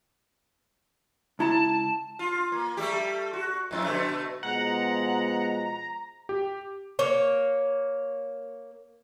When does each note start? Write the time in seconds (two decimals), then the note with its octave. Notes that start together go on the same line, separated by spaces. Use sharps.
1.39 C#2 E4 A5 A#5
2.19 F4
2.52 A#3
2.77 G3 A3 G4
3.33 F#4
3.71 F2 A2
3.85 B2 D3 A3
4.43 B2 F3 G#3 F#5 A#5
6.29 G4
6.99 A#3 C#5